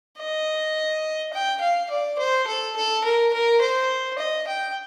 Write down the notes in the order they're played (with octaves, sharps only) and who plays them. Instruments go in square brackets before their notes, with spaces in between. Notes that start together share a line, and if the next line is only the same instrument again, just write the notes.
[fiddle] D#5
G5
F5
D5
C5
A4
A4
A#4
A#4
C5
D#5
G5